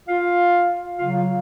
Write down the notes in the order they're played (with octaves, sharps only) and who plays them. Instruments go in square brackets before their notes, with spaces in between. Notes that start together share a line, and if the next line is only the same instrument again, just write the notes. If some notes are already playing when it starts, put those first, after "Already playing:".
[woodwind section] F4 F5
C#3 F#3 F4 F5
F4 F5